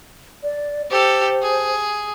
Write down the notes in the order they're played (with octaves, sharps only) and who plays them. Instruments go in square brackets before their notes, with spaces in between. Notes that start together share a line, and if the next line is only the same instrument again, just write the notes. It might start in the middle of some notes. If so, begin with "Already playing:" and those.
[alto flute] D5
[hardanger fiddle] G4 A4 [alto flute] C5
[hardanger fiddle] G#4